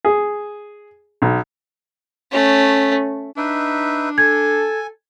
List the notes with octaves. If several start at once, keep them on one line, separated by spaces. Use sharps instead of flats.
G#4
B1
A3 C#4
D4 D#4 B4 E5
A4 G#5 G#6